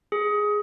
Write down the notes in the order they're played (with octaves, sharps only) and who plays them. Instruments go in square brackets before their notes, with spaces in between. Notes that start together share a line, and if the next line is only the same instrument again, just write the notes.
[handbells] G#4